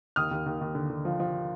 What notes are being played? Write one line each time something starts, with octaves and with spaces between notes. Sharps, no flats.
D#2 D#6 F6
D#2
D#2
D#2
D3
D3
F3
F3